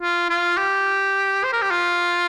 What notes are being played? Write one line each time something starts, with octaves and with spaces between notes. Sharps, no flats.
F4
F4
G4
C5
A#4
G4
F4